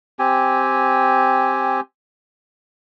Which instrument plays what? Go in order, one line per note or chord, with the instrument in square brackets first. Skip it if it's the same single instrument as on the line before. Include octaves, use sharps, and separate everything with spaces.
[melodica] C4 G4 G#5